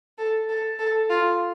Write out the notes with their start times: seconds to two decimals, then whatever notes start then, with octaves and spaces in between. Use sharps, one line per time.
0.18 A4
0.49 A4
0.79 A4
1.10 F4